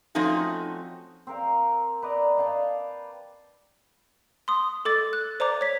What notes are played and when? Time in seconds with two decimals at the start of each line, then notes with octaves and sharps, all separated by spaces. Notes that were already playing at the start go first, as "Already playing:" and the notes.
0.15 F3 A3 C4 C#4 D#4 F#4
1.27 C4 A#4 F5
2.02 B4 D5 D#5 A#5
2.37 D5 F5 G5 A5
4.48 C6 D#6
4.85 A4 D6 A6
5.13 F#6
5.40 C5 D5 A#5 D6
5.61 C#5 B6